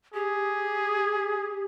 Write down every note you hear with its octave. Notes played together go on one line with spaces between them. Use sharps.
G4 G#4